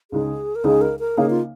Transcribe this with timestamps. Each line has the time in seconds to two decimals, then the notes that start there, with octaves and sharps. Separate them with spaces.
0.11 C#2 C#3 G#3 D#4 G#4
0.55 A#4
0.64 C#2 C#3 G#3 D#4 G#4
0.82 A#4
1.00 A#4
1.17 C#3 A#3 D#4 G#4 C#5 F5
1.30 F4